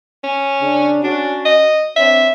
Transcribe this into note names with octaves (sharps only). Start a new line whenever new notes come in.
C#4
C#3 D4
C#4 D4 F#4
D#5
C4 D4 C#5 E5